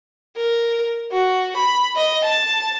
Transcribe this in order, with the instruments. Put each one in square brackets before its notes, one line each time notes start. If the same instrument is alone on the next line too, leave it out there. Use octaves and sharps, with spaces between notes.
[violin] A#4
F#4
B5
D#5
A5